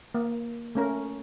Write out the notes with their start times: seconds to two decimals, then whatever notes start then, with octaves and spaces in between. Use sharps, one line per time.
0.14 A#3
0.75 A3 C#4 A#4